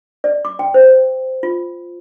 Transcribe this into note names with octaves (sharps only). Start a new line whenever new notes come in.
D5
D6
G5
C5
F4